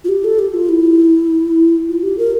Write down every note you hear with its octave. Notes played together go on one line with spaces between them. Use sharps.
F4
G4
A4
G4
F4
E4
F4
G4
A#4